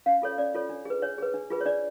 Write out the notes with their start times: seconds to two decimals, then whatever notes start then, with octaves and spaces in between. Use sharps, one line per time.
0.06 C#4 F5
0.22 F4 A4 C#5
0.32 C#5
0.38 C#4 D5
0.54 F4 A4 C#5
0.69 D4
0.85 G#4 B4
1.02 D4 C#5
1.18 G#4 B4
1.34 D4
1.50 F4 G#4 B4
1.61 C#5
1.66 D4 D5